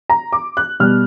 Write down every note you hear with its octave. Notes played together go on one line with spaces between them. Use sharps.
A#5
D6
F#6
B2 G3 F6